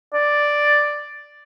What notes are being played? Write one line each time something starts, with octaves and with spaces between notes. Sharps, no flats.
D5